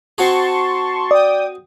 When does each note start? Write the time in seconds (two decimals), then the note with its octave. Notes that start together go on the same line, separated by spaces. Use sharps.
0.18 C4 F#4 G#4 A5 C6 C#6
1.11 D5 G5 D#6